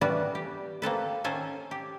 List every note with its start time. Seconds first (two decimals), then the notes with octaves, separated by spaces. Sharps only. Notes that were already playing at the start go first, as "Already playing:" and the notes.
0.01 E3 G3 B3 D4 F#4 B4
0.35 G4
0.82 A#3 C4 A4 B4
1.24 D#3 C#4 A4 C5 G#5
1.71 G4